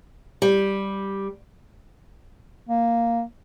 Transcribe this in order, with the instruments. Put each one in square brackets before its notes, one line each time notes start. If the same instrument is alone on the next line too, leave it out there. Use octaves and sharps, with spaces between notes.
[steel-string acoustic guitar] G3
[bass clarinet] A#3